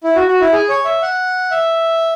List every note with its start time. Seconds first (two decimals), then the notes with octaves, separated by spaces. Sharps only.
0.04 E4
0.16 F#4
0.28 F#4
0.41 E4
0.53 G#4
0.69 C#5
0.85 E5
1.02 F#5
1.51 E5